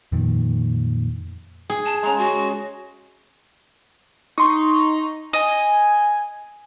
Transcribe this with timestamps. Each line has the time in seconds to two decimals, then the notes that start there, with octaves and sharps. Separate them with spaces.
0.12 F2 A#2 D#3
1.70 G#4
1.85 A5
2.03 C#3 G#3 A#5
2.18 F#4
4.38 D#4 C6 C#6
5.33 D#5 G#5